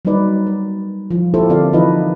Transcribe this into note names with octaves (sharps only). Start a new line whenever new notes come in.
F#3 G3 A#3 D#4 B4 D5
B4
F3 F4
A#3 E4 F4 G4 A4 C5
D3 A#3 C4 F4 D5 F5
E3 F3 D#4 B4 D#5